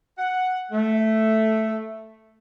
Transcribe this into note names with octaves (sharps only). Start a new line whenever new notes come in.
F#5
A3